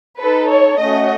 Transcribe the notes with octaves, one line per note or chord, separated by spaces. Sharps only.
D#4 A4 B4
C#5
A3 C#4 F#4 D#5